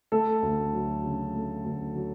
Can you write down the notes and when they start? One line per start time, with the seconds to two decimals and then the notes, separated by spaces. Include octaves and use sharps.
0.12 A3 A4
0.42 D2
0.73 F#3
1.04 C#3
1.35 A3
1.64 D2
1.96 F#3